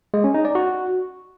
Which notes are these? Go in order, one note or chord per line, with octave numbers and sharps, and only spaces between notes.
G#3
C#4
D#4
D5
F#4